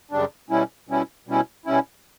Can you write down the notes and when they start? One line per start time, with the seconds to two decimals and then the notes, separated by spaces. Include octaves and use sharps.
0.11 F#2 C#3 G3 D4
0.50 B2 G3 C#4 E4
0.88 B2 G3 C#4 E4
1.27 B2 G3 C#4 E4
1.66 B2 G3 C#4 E4